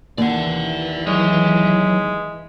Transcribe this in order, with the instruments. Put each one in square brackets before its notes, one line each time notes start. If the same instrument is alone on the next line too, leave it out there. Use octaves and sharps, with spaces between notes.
[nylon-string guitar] D#2 [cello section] E3 [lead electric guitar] D5 F#5
[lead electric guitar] F#3 [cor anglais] G#3